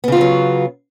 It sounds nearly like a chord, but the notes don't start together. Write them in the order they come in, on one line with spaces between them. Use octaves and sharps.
B3 C#3 F4 E3 F#3